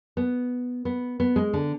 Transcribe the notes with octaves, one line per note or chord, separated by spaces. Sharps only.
B3
B3
B3
G#3
D3